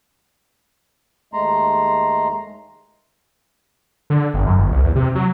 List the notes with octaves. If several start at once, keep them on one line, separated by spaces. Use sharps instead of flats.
D#2 G#3 A3 A#5 C6
D3
G1
F#2
G1
C2
E2
C3
F#3